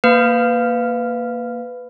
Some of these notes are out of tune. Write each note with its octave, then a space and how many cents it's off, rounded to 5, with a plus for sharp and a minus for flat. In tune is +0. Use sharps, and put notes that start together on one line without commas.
A#3 +0 B4 +15 F5 +0